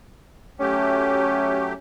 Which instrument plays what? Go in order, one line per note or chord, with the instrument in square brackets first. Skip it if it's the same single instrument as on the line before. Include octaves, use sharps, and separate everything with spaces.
[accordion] F#3 A3 G4 [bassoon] C#4